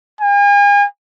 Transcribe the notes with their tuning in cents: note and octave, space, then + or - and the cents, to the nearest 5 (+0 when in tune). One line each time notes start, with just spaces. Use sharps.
G#5 -40